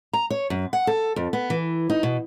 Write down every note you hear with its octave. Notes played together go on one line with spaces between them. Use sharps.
A#5
C#5
F#2
F#5
A4
F2
B3
E3
D#4
B2